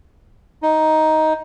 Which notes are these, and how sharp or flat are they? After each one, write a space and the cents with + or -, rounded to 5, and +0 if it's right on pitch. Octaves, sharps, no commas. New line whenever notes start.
D#4 +10